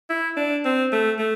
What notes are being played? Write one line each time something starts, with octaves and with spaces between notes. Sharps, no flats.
E4
D4
C4
A3
A3